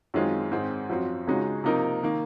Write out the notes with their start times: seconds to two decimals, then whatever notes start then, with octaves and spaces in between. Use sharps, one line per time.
0.14 F#2 D#3 G#3 C4 F4
0.52 G#2 D#3 G#3 C4
0.89 F#2 F3 C4 F#4
1.27 C#2 C#3 G#3 D#4 F#4
1.64 C3 F3 A#3 D#4 A#4
2.03 D#3 A#3